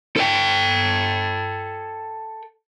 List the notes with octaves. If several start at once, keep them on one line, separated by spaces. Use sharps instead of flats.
A4 G5